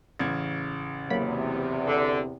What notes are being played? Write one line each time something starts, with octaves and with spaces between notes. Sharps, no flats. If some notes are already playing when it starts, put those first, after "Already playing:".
A1 C#3 G#6
E2 C3 F#3 A#3 B5
D3